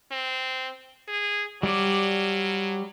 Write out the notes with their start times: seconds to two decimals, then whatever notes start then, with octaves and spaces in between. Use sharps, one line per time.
0.12 C4
1.08 G#4
1.63 F#3 G3 D5